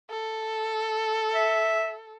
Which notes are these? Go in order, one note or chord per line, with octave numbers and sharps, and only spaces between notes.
A4
E5